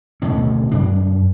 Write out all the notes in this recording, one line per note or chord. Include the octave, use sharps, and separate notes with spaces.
D1 D2 B2 C#4
F#2 D4